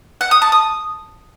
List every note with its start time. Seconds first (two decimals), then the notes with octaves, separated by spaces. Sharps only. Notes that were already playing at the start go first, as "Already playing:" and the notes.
0.21 F#5
0.31 D#6
0.42 A5
0.52 D#6